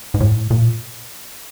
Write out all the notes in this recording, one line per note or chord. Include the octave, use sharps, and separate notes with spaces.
G#2
A2
A#2